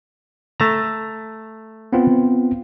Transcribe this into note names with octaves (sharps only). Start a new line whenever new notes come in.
A3 A5 A#5
B3 C4 F4